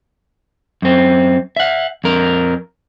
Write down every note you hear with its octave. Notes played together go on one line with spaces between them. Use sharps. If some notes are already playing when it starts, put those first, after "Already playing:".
F#2 C4
E5 F#5
F2 A#4